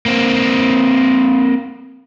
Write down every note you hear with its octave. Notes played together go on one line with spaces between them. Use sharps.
A#3 C4